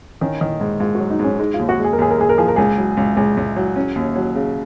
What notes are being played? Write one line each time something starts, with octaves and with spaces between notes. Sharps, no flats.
D#3 C#4
D#3
G#2
G#2 F4
F#3 F#4
D#4
G#2 C#4
G#3 D#4
F4
D#2
F#4
G#3
G#4
A#4
D#2 G#4
A#4
G#3 G#4
A#4
F3 G#4
A#4
C#2 G#4
F#3
C#2
C#2 G#4
C#2
F#3
C#4
D#2
F#3
C#3